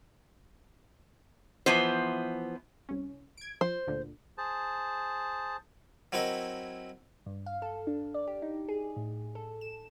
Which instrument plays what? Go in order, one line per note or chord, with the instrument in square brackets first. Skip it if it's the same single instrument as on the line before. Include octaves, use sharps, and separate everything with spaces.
[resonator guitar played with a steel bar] E3 F3 B3 C5
[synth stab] C2 C#4
G#6 D7
[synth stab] F3 [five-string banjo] C5
[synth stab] D2 A#2 D3
[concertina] G#4 C5 A5
[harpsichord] F#3 C4 E4 A#4 D#5
[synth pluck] G2
F5
A4
D4
D5
G4
D#4
G#4
A2
A4
E7